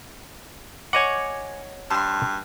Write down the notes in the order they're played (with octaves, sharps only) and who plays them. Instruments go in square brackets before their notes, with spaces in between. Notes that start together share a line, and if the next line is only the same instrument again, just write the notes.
[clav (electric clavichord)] C#5 D#5 F#5 [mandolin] G#5 C#6 D6
[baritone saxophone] G2 [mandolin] A5 C6